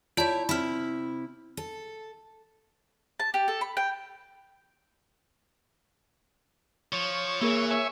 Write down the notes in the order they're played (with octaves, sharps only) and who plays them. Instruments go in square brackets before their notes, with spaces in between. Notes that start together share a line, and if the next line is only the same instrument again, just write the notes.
[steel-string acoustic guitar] E4 C#5 [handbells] F4 D5 A5
[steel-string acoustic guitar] C3 E4 [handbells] B5 F6
[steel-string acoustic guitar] A4
[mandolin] A5
G4
A4
B5
G5
[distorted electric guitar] F3 [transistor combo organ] C#5
[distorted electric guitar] E3 [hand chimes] A#3 G#4 A#4
[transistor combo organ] C#5 E5 G#5